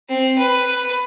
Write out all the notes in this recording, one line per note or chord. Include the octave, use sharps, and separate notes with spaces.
C4
B4